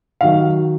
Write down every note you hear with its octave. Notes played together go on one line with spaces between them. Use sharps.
D#3 F#3 F5